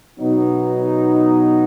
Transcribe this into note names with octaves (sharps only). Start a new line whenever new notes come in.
B2 F#3 B3 D#4